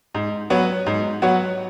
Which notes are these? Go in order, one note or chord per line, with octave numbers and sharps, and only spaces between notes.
G#2
F#3 B3 F#4 C#5
G#2
F#3 B3 F#4 C#5